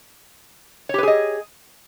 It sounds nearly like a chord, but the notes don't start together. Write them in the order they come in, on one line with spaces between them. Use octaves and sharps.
C#5 G4 B4 G#4 D#5